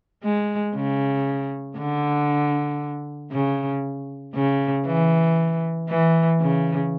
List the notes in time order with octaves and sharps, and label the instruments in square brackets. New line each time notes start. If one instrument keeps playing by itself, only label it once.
[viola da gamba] G#3
C#3
D3
C#3
C#3
E3
E3
C#3